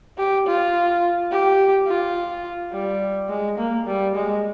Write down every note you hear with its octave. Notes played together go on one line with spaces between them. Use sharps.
G4
F4
G4
F4
G3
G#3
A#3
G3
G#3